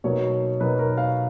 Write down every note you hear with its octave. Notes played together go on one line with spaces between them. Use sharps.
B2 F#3 A#3 D#4 C#5
B2 F#3 A#3 D#4 B4
A#4
F5